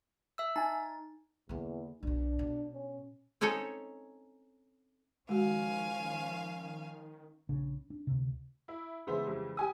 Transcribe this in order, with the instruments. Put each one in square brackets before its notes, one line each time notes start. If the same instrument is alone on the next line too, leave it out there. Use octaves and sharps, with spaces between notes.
[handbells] E5 E6
[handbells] D#4 [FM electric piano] G#5 A5
[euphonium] E2 [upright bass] D3 A#3
[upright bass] B1 B2 [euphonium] D4
[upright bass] B2
[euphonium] C#4
[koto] C4 C#4 D#4 A4 C#5
[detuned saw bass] D#3 [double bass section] F3 C#4 [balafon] G#3 F#4 [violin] F5 G#5
[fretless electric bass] A#1 C#3 D4
D4
D2 C3
[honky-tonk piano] E4
[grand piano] C#3 E3 G#3 [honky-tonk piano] B3 C5 E5
[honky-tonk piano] F2 G3
G4 G#5 D#6